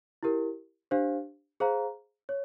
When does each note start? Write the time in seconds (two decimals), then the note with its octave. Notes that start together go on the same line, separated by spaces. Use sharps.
0.23 E4 G4 A#4
0.91 D4 G4 C5 F5
1.60 G#4 C5 F5 A#5
2.29 C#5